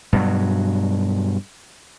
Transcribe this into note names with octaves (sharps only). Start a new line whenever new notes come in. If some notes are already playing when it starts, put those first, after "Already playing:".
G2 B2 F#3